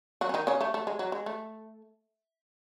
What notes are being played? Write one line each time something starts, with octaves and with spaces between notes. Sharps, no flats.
F#3 F#4
C#4
D#3 D#4
C#3 C#4
A3
A3
G#3
F#3
G#3
A3